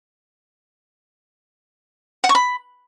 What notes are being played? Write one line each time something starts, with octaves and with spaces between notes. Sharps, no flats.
F#5
C#6
B5